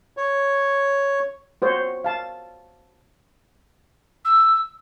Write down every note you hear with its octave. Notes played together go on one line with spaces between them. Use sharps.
C#5
F#4 C5 C#5
F5 A5
E6